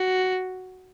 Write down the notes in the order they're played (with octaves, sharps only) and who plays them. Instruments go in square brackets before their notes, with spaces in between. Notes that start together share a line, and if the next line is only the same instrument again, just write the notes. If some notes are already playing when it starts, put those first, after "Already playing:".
Already playing: [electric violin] F#4